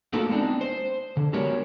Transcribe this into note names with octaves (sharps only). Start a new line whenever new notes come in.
A3 A#3 D#4 F4 F#4 A4
G#3 B3 C4 D4 D#4
C5
D3
F#3 G#3 B3 G4 A#4 C#5